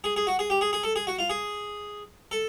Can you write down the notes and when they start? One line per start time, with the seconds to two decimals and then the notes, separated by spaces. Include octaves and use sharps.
0.04 G#4
0.16 G#4
0.27 F#4
0.39 G#4
0.50 G4
0.61 G#4
0.73 G#4
0.83 A4
0.96 G#4
1.07 F#4
1.19 F4
1.30 G#4
2.31 A4